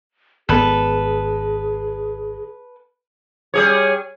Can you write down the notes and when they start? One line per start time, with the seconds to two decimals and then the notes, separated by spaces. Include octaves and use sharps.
0.49 G#1 B3 G#4 A4 B4
3.54 G3 G#4 C#5